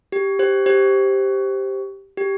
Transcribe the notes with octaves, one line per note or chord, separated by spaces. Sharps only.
G4
G4 C5
G4 C5
G4